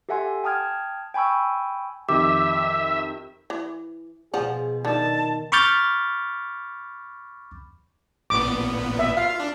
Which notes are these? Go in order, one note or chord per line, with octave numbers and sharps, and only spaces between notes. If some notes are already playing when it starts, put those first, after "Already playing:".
G4 A4 E5 F#5 G#5 C6
G5 A5 D#6 F6 G#6
G5 G#5 B5 C#6 E6
F2 D#3 G4 E5 D6
E3
B2 F3 G#4 F#5
D3 D#3 F3 A5
B5 C#6 D6 F6 G6 A6
A1 A#2 B3 D6
E5
F4 F5
D4